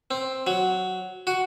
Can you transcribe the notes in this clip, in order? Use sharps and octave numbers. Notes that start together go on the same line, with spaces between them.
C4
F#3
F#4